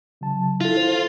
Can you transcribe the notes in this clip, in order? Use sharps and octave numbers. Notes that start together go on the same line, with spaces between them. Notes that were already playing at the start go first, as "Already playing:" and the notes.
C#3 F#3 A5
E4 F4 A4
C5